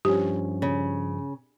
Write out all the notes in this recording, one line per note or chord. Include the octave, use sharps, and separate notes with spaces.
G2 F3 C#4 G4
C#3